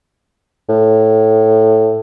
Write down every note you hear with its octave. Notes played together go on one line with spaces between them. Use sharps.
A2